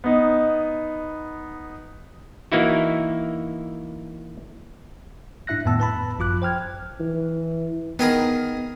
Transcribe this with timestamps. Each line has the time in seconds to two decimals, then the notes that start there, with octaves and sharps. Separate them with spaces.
0.04 B3 D#4
2.52 E3 A#3 D#4 E4 F#4
5.47 G#2 D4 E4 E5 F#6 A#6
5.65 F2 A2 D#3 B3 A5 E6
5.80 B4 A5 B5
6.18 G#1 F#2 F3 F4 D6 F#6
6.42 C5 G5 F6 G#6
7.00 E3
7.99 D#3 B3 G#4 A#4